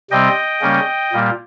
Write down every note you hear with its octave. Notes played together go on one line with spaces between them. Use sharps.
C3 G3 C4 D#5 G5
C#3 G3 A#3 C#4
A#2 G3 A#3